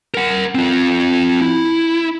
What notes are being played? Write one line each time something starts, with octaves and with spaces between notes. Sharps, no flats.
A#4 F#5
C4 F4
E4